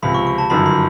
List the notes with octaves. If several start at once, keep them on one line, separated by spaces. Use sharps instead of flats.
C#2 C3 F3 B5
C#6
C#6
A5
G1 F#2 D#3 B5
B5